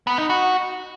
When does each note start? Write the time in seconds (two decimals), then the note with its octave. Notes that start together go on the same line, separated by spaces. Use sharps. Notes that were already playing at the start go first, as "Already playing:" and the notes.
0.07 B3
0.18 D#4
0.30 F#4